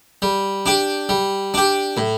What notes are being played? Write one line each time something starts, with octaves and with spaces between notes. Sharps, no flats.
G3
D4 G4
G3
D4 G4
A2